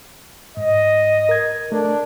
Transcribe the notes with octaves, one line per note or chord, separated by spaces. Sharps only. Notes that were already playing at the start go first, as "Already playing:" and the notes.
G#2 D#5
A#4 G#6
A3 D4 A#4